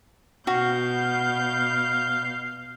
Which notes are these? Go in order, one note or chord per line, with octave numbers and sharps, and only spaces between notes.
B2 F#4 F5 G6